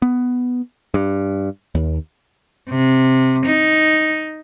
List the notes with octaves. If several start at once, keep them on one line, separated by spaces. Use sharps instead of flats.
B3
G2
D#2
C3
D#4